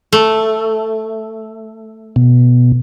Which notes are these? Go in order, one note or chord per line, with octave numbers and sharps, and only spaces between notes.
A3
B2